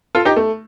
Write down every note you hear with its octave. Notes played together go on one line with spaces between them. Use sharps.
F4 A4
D#4 G4
A3